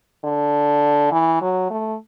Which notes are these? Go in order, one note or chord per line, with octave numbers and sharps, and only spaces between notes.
D3
E3
F#3
A3